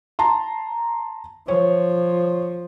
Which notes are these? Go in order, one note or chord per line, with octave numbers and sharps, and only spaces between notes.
A5 A#5 C6
F3 C#5